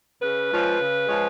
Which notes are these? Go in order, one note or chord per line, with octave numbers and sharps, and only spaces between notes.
C#3 B4
F3 G#3 C#4 F4
C#3
F3 G#3 C#4 F4